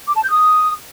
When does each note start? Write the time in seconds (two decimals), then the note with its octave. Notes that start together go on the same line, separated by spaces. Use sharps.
0.07 D6
0.15 A5
0.23 G6
0.31 D#6